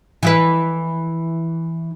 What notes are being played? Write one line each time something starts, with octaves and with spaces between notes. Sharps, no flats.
E3 E4 B4